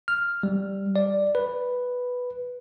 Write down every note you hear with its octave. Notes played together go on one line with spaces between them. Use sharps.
F6
G3
D5
B4